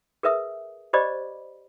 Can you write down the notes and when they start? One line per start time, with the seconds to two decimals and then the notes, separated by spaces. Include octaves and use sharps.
0.23 G#4 A#4 B4 E5 D#6
0.93 G4 C5 D5 D#5 B5 D6